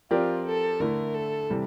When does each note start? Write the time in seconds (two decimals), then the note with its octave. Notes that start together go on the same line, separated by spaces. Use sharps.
0.11 F3 C4 F4 G4 A#4 D5
0.46 A4
0.80 D3 A3 E4 A#4
1.15 A4
1.50 C3 E3 G3